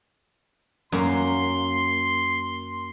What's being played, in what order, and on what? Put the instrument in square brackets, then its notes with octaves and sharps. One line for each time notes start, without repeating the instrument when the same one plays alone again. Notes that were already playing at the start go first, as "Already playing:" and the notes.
[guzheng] F#2 A#3 [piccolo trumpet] C6